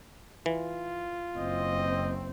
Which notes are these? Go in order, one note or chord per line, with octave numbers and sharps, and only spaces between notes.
E3 F4
F#1 C4 D#5